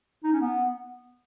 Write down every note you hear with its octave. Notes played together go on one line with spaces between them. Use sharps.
D#4
C#4
B3